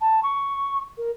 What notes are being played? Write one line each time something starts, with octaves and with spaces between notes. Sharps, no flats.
A5
C#6
A#4